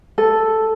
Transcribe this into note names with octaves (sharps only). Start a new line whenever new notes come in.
A4